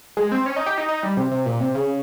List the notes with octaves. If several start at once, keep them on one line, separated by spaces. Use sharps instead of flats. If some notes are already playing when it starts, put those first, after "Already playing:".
G#3
C4
C#4
D#4
G4
D#4
D#4
G3
C3
C3
A#2
C3
C#3